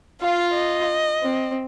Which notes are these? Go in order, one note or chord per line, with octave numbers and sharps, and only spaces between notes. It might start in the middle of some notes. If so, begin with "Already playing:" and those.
F4 F5
D#5
C4